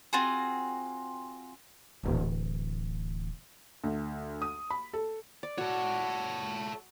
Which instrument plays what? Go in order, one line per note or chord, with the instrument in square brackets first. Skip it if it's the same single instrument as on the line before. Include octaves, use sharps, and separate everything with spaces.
[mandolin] C4 F4 F#4 G#4
[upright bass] D1 E3
[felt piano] D2
D#6
B5
A4
[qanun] D5
[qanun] F#4 [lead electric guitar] A4 C#5